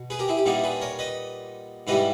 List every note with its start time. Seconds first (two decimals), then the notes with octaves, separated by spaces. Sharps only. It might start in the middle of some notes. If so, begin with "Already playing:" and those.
Already playing: B2
0.10 G#4 B4
0.19 G4 A#4
0.28 E4 G#4
0.37 G4
0.46 A#2 G3 B3 D#4 E4 G#4
0.64 G#4 B4
0.81 A#4 C#5
0.99 B4 D#5
1.87 G#2 E3 G3 B3 E4 B4 D#5